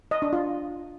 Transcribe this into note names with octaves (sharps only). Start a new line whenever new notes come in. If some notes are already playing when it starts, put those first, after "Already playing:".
D#5
D4
F4